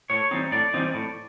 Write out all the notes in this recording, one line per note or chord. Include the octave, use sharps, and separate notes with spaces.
A2 C#5
E3 G3 C4 D#4
A2 D5
E3 G3 C4 D#4
A2